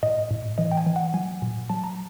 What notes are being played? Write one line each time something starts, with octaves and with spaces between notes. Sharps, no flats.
A2 D#5
A2
E3 D#5
G5
G#5
E3
F#5
F#3 G#5
A#2
F#3 A5
A#5